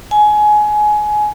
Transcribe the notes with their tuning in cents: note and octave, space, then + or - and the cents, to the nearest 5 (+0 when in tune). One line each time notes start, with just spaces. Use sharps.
G#5 +20